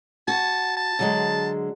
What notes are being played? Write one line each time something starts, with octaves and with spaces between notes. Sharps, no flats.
F#4 A5
A5
D3 F#3 G#3